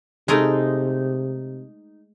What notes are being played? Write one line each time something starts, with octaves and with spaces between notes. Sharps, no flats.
C3 G#3 A3 D#4 A#4 C6